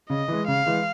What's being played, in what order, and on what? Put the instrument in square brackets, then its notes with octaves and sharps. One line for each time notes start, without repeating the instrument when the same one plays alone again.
[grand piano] C#3 [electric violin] D#5
[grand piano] E3 G#3
[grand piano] C#3 [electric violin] F5
[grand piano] E3 G#3